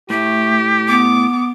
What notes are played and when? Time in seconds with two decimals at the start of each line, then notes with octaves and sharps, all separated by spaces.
0.10 A2 A3 G4
0.88 B3 D6